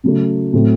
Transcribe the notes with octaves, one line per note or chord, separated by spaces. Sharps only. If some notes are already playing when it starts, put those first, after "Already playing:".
C#3 F#3 A3
A2 F#3 A3 C4